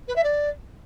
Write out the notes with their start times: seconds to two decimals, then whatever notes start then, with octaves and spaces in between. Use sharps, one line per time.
0.08 B4
0.16 E5
0.24 D5